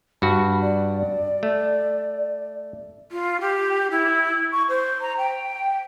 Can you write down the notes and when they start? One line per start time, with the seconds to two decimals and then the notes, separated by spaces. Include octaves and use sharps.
0.22 G2 F#4 B5
0.61 D5
1.43 A3
3.11 F4
3.40 G4
3.91 E4
4.52 C#6
4.68 C5
5.01 A#5
5.17 G5